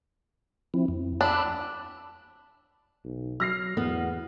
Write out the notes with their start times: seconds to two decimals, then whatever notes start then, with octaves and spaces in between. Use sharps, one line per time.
0.74 F3 C4 E4
0.88 F2
1.21 D4 B5 E6 F#6
3.04 B1
3.40 F#3 F6 A#6 C7
3.77 E2 B3